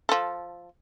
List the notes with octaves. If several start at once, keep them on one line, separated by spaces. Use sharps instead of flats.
F3 A4